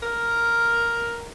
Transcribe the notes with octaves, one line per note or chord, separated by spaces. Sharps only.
A#4